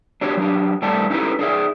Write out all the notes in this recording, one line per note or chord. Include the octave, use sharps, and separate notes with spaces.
D4 F#4 G4 C#5
F#3 D4 G4
A2 G3 A4 D5 E5 A5
C#4 D#4 E4 G4 A4 B4
D4 D#4 G#4 D5 E5